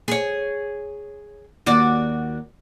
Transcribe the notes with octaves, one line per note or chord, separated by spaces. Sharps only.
G#4 C#5
D#2 F#4 D5